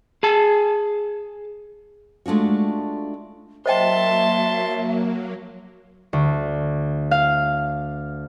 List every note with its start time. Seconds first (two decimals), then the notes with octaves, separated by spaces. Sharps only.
0.23 G#4 A5
2.26 G#3 A3 D4 F4 F#4
3.66 F#3 A#3 C5 D#5 E5 G5 A5 C6
6.13 D2
7.11 F5